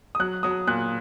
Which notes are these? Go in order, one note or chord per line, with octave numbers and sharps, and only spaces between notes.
D#6
F#3 F#6
F#3 D#6
A#2 F#6